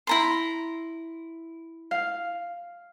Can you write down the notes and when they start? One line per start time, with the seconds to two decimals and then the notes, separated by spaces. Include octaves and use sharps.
0.07 E4 A#5 C6
1.91 F5